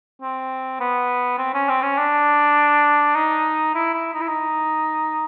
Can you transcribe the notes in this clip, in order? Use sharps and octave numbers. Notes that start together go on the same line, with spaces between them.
C4
B3
C4
C#4
C4
C#4
D4
D#4
E4
E4
D#4
E4
D#4